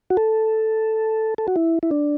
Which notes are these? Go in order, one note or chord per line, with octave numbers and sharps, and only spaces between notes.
F#4
A4
A4
F#4
E4
E4
D4